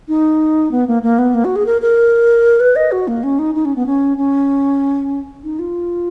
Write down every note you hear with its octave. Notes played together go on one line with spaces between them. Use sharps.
D#4
B3
A#3
A#3
B3
A#3
F#4
G#4
A#4
A#4
B4
D#5
F#4
A#3
C#4
D#4
D#4
C#4
B3
C#4
C#4
D#4
F4